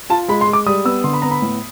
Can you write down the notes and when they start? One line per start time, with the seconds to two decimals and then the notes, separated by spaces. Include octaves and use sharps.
0.10 F4 A5
0.28 G#3 B5
0.41 C6
0.47 G#3
0.53 D6
0.66 G3 D#6
0.85 B3 E6
1.04 D3 C6
1.13 B5
1.22 B3 A#5
1.31 B5
1.42 A2